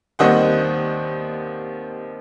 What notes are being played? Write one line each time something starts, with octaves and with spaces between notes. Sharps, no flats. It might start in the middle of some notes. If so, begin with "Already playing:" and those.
D#2 D#3 G3 C4 D#5 F#5